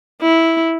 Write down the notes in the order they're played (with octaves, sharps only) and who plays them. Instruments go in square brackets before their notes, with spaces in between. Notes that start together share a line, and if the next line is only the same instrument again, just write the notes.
[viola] E4